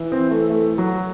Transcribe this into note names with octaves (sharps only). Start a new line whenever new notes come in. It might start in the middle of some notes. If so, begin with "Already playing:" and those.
Already playing: E3
C4
A3
A3
F#3